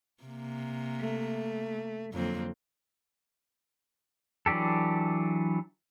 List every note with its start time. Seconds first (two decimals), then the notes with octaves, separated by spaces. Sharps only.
0.23 C3 A#3
0.99 A3
2.14 F2 D3 F#3 A#3 C4
4.46 E3 F#3 D4 G4 A4